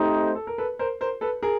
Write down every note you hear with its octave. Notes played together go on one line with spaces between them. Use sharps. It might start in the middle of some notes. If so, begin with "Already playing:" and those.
Already playing: A3 C4 D#4 G4 C5
A4
A#4
A4 B4
A#4 C5
A#4 C5
A4 B4
G#4 A#4